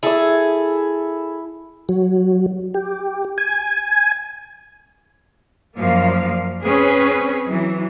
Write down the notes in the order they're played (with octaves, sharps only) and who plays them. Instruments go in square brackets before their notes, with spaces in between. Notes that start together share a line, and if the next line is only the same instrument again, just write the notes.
[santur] E4 E5 [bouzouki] G#4 A4
[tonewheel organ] F#3
G4
G#5
[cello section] F#2 F3 A#3 D5 F5
C4 C#4 G#4 B4
E3 F#3